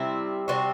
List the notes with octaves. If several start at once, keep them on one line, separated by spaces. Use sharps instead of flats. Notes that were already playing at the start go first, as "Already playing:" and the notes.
Already playing: C3 G3 C4 E4
C3 G3 C4 F#4